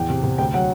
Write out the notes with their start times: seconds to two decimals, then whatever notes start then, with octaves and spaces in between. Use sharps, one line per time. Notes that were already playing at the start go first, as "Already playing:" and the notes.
Already playing: E2 G5
0.10 C3
0.23 C3
0.38 D2 G5
0.54 F#3 F#5